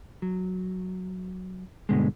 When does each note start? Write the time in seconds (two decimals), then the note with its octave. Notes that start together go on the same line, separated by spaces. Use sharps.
0.22 F#3
1.89 D2 G2 B2 D3 G#3